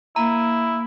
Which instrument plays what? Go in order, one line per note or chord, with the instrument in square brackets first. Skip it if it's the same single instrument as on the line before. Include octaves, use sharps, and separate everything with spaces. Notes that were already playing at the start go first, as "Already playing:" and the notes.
[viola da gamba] A#3 [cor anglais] E4 [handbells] A#5